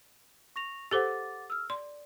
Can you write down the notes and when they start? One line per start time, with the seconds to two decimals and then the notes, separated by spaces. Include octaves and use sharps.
0.56 C#6 A#6 F7
0.91 G4 A4 C5 F#5 D6 A6
1.50 E6 F6
1.70 D5 C6